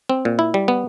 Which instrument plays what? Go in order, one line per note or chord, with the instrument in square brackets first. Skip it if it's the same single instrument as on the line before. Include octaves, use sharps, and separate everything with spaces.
[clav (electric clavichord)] C4
A#2
E4
G3
B3